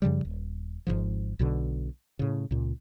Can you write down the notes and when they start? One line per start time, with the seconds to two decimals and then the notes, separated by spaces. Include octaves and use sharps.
0.02 F#2 C#3 F3 G3
0.25 D#1
0.87 G#1 C#2 G#2 F3
1.39 B1 B2 D3
2.19 A2 C#3
2.51 C#2 A#2